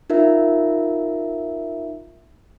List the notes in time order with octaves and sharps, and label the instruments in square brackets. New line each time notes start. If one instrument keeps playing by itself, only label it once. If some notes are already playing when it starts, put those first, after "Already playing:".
[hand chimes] D#4 F4 A#4 E5